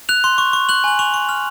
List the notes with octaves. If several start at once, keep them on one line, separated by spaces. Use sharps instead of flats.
F#6 F7
C6
C#6
C#6
F#6 F#7
G#5 F#7
C#6 F7
C#6
F6